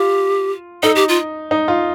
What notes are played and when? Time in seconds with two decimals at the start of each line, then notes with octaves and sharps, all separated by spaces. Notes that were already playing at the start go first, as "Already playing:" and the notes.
Already playing: F4 G4
0.83 D#4 A4
0.96 G4
1.09 F4
1.51 D#4
1.68 F4